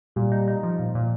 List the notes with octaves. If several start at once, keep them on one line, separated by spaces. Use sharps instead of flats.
A#2 G3
D#4
D#4
F3
A#2
A#2